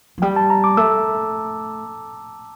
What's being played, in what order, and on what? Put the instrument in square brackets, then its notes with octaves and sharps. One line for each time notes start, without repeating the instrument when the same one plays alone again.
[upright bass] F3
[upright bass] G3 [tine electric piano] G5
[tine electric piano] A5
A#5
D6
[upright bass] A3 [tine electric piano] E6